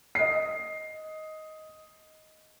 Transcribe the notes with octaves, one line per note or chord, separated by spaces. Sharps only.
D#5 C7